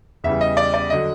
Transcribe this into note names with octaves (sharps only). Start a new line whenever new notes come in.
E2 C#3 E3 G3 E5
D#5
D5
D5
D3 F#3 D#5